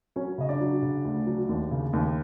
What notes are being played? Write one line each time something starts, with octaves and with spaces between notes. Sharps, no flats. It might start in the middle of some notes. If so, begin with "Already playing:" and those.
F#3 C#4 C#5
C#3 D#5
D4 D5
F#3
C#3
D2
F#3
D#2
C#3
D#2